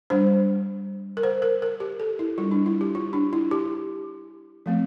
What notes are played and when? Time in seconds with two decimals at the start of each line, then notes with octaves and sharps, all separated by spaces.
0.10 G3 D4 C5
1.17 A#4
1.23 C5
1.42 A#4
1.62 A#4
1.80 G4
2.00 A4
2.19 E4
2.38 G3 D4 F4
2.51 D4
2.66 E4
2.81 G4
2.95 F4
3.13 D4
3.33 E4
3.51 G4
4.66 F3 A3 C4